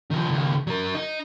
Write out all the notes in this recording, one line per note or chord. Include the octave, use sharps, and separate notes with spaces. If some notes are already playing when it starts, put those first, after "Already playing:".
D#3 F3
C#2 D#3
F#3 A#4
D#4